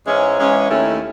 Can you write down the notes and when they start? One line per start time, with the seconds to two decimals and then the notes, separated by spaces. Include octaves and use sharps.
0.06 G#2 E3 G#3 C#4
0.38 G#2 E3 G#3 C#4
0.69 D#2 D#3 A3 C#4 E4